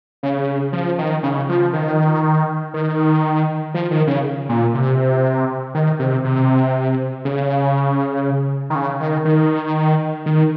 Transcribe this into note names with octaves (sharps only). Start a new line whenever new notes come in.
C#3
F3
D#3
C#3
F3
D#3
D#3
F3
D#3
C#3
A#2
C3
D#3
C3
C3
C#3
D#3
C#3
D#3
D#3
D#3